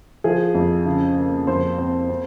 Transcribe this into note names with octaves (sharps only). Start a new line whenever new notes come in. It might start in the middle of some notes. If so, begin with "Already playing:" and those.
F3 G#4
F2
C#3
A#3
F2 C5
C4
C4